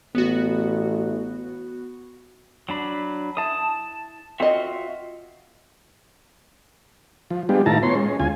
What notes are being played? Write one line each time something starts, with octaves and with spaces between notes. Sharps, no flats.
A1 B3 F#4
F#3 D4 B5
E4 A5 D#6
C4 F4 F#4 D#5 E5
F3
G3 G#3 B3 D4 F4 G4
A2 D#3 E4 F4 A5 A#5
B3 C#5 C6
G#3 C#4
D2 F4 G#5